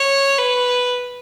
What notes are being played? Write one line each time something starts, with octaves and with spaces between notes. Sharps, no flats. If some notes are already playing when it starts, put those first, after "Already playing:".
Already playing: C#5
B4